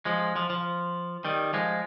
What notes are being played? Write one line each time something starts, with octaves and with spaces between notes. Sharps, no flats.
F3 G#3
F3
F3
D#3 G3
F3 G#3